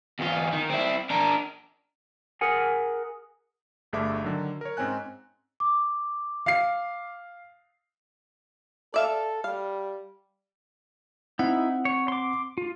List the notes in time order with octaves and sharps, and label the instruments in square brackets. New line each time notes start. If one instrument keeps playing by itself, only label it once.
[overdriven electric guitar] E2 F4
D#3
C4 E4
D4 A#4
[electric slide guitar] G#4 A#4 F#5 G#5
[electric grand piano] G1 G2 A3 G#4 E5 D6
D3 D#3 F#3
A#4 C#5
G#2 C4 C#4 G#5 F#6
[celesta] D6
[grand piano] F5 C7
[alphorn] A4 [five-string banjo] D5 E5 F5
[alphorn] G3 [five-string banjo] F5
[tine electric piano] C4 F#5 [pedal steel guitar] D#4 E4
[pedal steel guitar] C#5
C6 D6
F4